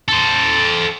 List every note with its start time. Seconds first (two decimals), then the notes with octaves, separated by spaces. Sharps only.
0.08 A4 C5